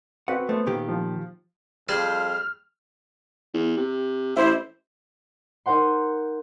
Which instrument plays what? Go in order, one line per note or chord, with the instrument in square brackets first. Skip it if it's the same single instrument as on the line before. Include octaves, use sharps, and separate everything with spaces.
[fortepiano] C4 F#4 B4 [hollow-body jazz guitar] F#5
[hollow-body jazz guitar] A3 [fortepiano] B3 C5
[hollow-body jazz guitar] A#2 D#3 G4
[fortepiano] F3
[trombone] F2 [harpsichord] G3 G#4 C5 [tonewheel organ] F6
[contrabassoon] E2
C3
[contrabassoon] A1 [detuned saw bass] E4 [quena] C5
[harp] D#4 A#4 C5 F#5 C6